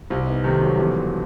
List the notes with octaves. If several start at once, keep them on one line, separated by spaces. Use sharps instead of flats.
C2 C4 E4
C4
B3 D#4
C3 D#3 A3 C4
F#3 A3
E1 E3 G3